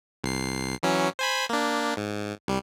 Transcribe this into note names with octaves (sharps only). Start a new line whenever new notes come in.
C2 C7
E3 F#3 C#4
C5 G#5 B5
A#3 D4
G#2
C2 G3